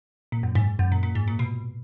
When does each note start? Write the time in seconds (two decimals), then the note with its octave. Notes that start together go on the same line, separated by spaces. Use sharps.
0.32 A#2
0.43 F#2
0.55 G#2
0.79 F#2
0.92 A#2
1.03 A#2
1.15 G#2
1.28 A#2
1.39 B2